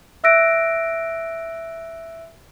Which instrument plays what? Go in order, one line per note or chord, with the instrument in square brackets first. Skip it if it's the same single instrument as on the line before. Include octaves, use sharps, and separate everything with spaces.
[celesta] E5 E6 F#6 A#6 D7